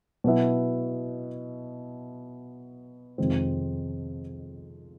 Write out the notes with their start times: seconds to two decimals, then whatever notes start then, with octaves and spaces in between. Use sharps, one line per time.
0.24 B2 F#3 B3 E4
3.18 F2 C3 D#3 G#3 C4